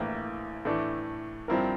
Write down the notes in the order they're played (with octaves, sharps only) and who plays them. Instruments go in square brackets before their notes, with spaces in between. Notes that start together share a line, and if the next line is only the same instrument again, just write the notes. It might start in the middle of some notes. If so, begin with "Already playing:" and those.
Already playing: [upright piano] A#1 A2 E3 A#3 E4
A2 E3 A3 D4
G2 F3 C4 E4 A#4